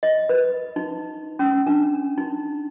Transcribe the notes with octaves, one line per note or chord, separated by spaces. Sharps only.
D#5
B4
D#4
C#4
D4
D#4